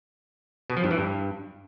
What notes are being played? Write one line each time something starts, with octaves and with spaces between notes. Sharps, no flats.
B2
F3
G2
E3
G2